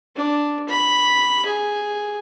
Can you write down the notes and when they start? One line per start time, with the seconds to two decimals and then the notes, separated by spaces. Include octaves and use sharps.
0.16 D4
0.69 B5
1.45 G#4